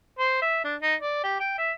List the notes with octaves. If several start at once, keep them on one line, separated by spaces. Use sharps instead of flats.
C5
E5
D4
D#4
D5
G4
G5
E5